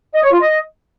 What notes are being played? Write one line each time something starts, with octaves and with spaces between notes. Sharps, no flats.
D#5
C#5
F4
D#5